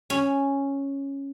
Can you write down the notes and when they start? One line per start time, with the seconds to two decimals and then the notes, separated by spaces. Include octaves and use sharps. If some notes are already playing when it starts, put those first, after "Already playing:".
0.10 C#4